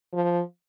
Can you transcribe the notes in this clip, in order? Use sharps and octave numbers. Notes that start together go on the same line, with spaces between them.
F3